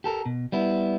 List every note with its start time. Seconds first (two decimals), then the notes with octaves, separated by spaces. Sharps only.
0.04 G4 A4 A#4
0.26 B2
0.52 G3 B3 E4